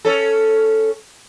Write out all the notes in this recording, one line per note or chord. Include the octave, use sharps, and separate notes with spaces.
C#4 A4